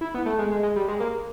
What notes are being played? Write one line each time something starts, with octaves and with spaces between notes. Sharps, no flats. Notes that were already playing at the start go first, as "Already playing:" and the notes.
E4
B3
A3
G#3
G#3
G#3
G3
G#3
A#3